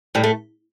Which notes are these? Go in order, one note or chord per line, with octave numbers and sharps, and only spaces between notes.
A2 G3
A3